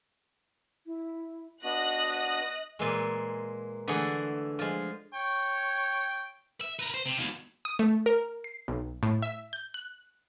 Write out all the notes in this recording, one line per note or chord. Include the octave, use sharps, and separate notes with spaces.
E4
B3 D4 F#4 D#5 D#6 F#6 A#6
A#2 E3 G#3
D3 E3 A3 G#4 F#5
F3 G#3
C#5 G5
E5
A#4 B4
C5
C3
D#2 B2
D#6
A3
A#4
C7
B1
A2
E5
G6
F#6